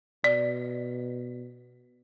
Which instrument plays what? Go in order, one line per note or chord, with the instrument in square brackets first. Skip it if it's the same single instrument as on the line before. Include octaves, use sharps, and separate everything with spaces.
[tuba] B2 [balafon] D5